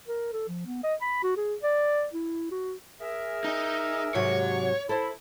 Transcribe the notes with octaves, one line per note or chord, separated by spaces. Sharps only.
A#4
A4
F3
B3
D#5
B5
F#4
G#4
D5
E4
F#4
G#4 A#4 E5
D#4
G#2 C3 F#3 C#5
E4 A4 C5